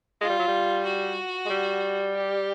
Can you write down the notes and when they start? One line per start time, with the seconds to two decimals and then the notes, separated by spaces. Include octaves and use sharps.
0.21 G#3 F4
0.29 G3
0.39 F#3
0.48 G3
0.85 F#4
1.46 G#3
1.49 G3
2.14 G4